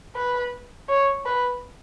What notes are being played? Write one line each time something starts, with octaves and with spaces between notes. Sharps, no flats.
B4
C#5
B4